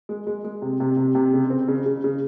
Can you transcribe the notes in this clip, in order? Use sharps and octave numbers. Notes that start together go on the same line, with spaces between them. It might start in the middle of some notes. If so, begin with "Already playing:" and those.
G#3
G#3
G#3
C3
C3
C3
C3
C#3
C4
C#3
C#3
C#3